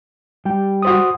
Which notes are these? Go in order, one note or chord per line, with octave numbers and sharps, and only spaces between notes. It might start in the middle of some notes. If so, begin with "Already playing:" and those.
G3 G4
F#4 C5 D#6